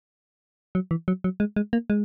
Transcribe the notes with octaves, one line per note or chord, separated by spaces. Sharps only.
F#3
E3
F#3
F#3
G#3
G#3
A#3
G#3